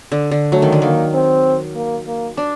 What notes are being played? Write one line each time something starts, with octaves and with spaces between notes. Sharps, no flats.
D3
D3
F#3 A3
D#3
D3
D#3 A#3
C4
A#3
A#3
D4